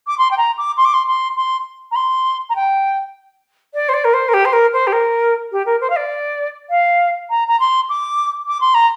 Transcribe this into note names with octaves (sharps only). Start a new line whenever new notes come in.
D6
C6
G5
A#5
D6
C6
D6
C6
C6
C6
A#5
C6
A#5
G5
D5
C5
D5
A#4
C5
A#4
G4
C5
A#4
C5
G4
A#4
G4
A#4
C5
F5
D5
F5
A#5
A#5
C6
D6
D6
C6
A#5